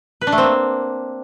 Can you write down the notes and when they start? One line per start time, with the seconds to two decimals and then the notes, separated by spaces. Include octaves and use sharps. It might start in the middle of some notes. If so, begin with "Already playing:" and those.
0.21 B4
0.27 D4
0.32 A3
0.38 C4
0.43 A#3